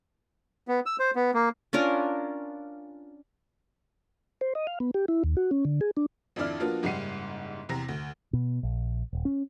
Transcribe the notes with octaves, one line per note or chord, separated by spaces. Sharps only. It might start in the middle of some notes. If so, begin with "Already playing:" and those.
B3
E6
C5
B3
A#3
C#4 D4 F4 A#4
C5
D#5
F5
B3
G4
E4
D#2
F#4
C#4
D3
G#4
D4
G#1 F2 D4 E4 D5 F6
F3 A#3 B3 D4 F4 F#4
F#1 G#2 G3 F#5 C7 D#7
E2 C3 A#5 A#6
D2
B2
A#1
D#1
C#4